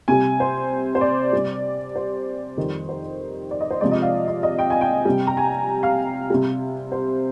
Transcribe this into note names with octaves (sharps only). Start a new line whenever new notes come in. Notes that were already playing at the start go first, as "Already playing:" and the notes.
C3 G3 G#5
C5
C5
D5
G3
C3
C5
F2 D#3 G3
C5
D5
D#5
C5
C3 F3 G#3 D5
D#5
F5
D#5
D#5
G5
G#5
G5
C3 G3
A#5
G#5
F5
C3 G3
C5